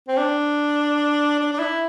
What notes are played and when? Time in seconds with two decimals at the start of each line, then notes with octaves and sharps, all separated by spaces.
0.08 C4
0.18 D4
1.40 D4
1.53 D4
1.59 E4